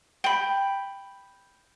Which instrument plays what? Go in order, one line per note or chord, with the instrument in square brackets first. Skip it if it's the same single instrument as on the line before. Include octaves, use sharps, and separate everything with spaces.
[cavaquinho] G5 B5